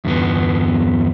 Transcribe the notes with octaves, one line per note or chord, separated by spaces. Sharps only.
E2 G2 B3